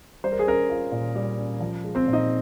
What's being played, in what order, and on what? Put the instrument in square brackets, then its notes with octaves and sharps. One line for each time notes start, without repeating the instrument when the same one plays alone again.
[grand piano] G3 C5
A#4
G#4
C#4 A#4
F4
A#2
G3
C#4
F3
G#3
C4 C5
A#2
D#4 D#5